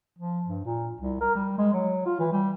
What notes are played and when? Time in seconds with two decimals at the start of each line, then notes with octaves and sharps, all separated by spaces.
0.19 F3
0.46 G2
0.65 A#2
1.01 C2
1.21 A#4
1.35 G3
1.58 G#3
1.73 F#3
2.06 F4
2.19 E3
2.32 G3